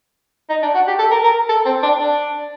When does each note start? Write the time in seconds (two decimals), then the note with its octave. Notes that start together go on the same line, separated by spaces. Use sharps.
0.50 D#4
0.62 D4
0.75 F#4
0.87 G4
0.99 A4
1.11 A#4
1.24 A#4
1.49 A4
1.66 C4
1.83 D4
2.00 D4